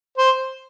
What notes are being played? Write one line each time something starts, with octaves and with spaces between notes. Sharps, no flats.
C5